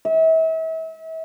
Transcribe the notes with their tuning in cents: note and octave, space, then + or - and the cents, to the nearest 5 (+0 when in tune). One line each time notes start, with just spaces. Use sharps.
E5 -35